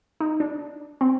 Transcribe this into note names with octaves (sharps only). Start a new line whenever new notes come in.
D#4
D4
C4